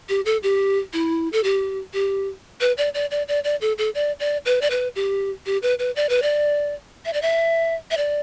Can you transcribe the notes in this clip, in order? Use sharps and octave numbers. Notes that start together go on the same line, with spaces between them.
G4
A4
G4
E4
A4
G4
G4
B4
D5
D5
D5
D5
D5
A4
A4
D5
D5
B4
D5
B4
G4
G4
B4
B4
D5
B4
D5
E5
D5
E5
E5
D5